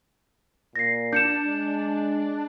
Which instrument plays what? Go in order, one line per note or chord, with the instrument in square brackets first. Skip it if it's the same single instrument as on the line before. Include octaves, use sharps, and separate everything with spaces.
[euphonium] A#2 [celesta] A#6 C7
[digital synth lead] D4 [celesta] G6 C#7 E7
[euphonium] G#3